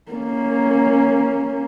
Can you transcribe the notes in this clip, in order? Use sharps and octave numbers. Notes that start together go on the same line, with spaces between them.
A#3 C#4